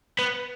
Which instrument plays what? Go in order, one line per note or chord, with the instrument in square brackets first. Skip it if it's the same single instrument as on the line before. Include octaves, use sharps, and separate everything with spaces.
[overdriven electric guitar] B3